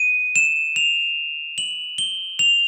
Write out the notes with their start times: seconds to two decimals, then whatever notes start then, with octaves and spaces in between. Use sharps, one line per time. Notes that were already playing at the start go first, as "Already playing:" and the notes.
Already playing: D#7
0.36 E7
0.76 F7
1.58 F#7
1.98 G7
2.39 F7